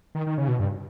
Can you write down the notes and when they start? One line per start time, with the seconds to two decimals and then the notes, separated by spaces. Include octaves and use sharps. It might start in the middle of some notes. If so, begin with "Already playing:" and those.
0.15 D#3
0.27 D#3
0.38 C#3
0.48 B2
0.60 G2